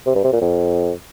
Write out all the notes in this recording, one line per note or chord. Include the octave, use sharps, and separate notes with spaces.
C3
G2
C3
A#2
F2